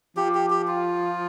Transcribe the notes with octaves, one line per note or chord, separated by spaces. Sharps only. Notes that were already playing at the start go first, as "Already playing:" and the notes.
F3 G4
G4
G4
F4